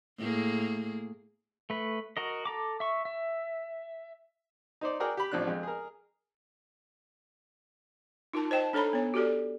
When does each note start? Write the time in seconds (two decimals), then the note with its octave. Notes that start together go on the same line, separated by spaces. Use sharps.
0.17 A2 A#3 G#4
1.70 A3 B4
2.17 F#4 A#4 D#5
2.45 A4 A#5 D6
2.80 E5 C#6
3.05 E5
4.81 D#4 C5 D5
5.00 F#4 G#4 A#4 D5 G5
5.17 G4 B5
5.32 A1 F3 C4 D4 F#6
5.47 F2 G#3
5.63 G#4 A#4
8.33 D#4 F4 A#4 A5
8.51 C5 D#5 G5 A5
8.73 D4 A4 C#5 A#5 B5
8.93 B3 C#5
9.14 F#4 G4 A4 D5